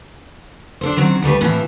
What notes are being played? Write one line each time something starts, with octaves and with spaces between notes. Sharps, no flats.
D4 A4 C5
D#3 F#3 C4 C#4
D2 G3 A3 B4
A2 C3 E3 F3 E4